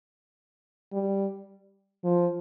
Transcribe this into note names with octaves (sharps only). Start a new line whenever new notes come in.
G3
F3